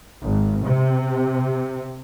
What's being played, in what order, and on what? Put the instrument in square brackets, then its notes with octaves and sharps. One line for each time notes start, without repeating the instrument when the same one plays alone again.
[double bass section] G#1
C3